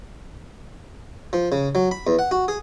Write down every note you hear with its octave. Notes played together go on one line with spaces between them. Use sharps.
F3
C#3
F#3
B5
E2
F#5
F#4
G#4